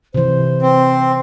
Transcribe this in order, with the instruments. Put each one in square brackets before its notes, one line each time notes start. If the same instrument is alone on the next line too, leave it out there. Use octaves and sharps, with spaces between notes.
[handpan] C3 E3 [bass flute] C5
[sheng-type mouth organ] C4